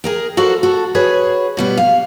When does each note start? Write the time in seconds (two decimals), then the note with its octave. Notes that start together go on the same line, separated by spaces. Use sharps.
0.04 G#4 A#4 G5
0.37 F#4 A4 A#4 C5 D5 F#5
0.63 F#4 A4
0.95 F#4 G#4 B4 C#5
1.57 B2 G3 B3
1.77 F5